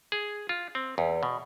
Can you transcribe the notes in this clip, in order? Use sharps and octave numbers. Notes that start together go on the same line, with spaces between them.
G#4
F4
C4
E2
B2